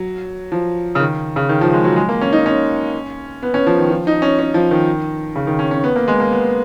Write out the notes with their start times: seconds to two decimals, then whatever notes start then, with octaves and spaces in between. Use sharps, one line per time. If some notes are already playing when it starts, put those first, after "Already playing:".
Already playing: F#3
0.52 F3
0.95 C#3
1.00 D#3
1.36 C#3
1.49 D#3
1.61 F3
1.73 G#3
1.84 F#3
1.96 G#3
2.09 A#3
2.21 C#4
2.33 D#4
2.46 C#4
3.43 B3
3.54 C#4
3.66 F3
3.78 D#3
3.90 F3
4.07 D#4
4.22 C#4
4.39 C#4
4.54 F3
4.71 D#3
5.36 C#3
5.47 D#3
5.59 C#4
5.71 C#4
5.84 B3
5.96 A#3
6.08 G#3
6.20 A#3
6.32 B3